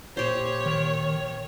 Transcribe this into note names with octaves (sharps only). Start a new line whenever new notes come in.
A#2 G4 C5 C#5
D#3